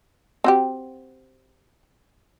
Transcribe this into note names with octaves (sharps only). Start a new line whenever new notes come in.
C4 F#4 G4